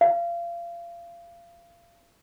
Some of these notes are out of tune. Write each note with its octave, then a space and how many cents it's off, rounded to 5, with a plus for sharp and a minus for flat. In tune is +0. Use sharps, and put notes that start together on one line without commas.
F5 -30